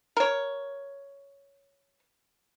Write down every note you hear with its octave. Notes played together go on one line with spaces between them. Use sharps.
A#4 C#5